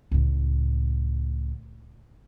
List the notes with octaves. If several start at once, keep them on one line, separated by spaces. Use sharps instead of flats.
C#2 A2